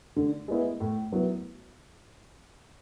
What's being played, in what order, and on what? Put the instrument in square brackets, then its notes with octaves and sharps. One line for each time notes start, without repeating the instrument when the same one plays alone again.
[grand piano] D3
G#3 B3 E4
A2
F#3 B3 E4